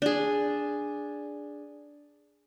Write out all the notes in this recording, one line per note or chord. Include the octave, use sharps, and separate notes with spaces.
D4 G#4